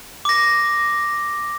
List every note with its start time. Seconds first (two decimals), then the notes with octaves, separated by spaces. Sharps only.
0.25 D6 A#6